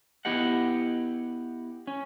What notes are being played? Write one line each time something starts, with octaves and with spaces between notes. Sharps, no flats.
B3 E4 G4 D#5 F#5
C#4